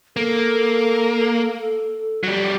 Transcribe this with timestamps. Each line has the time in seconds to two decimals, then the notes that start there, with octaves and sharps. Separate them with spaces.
0.17 A#3 A4
2.23 F#3 G3